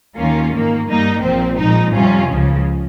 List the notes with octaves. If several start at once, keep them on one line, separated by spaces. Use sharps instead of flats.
D#2 D#3 A#3 C#4 F4
G#2 D#3 A#3
G2 G3 A#3 D#4
A#1 A#2 F3 C4
A#2 F3 G#3 D#4
F2 C3 G3 C#4 F4
C#2 C#3 F3